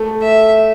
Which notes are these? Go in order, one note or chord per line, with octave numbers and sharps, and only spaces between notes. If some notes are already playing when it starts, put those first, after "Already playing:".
Already playing: A3
E5